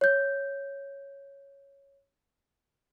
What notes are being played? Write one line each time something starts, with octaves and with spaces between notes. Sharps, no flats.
C#5 G6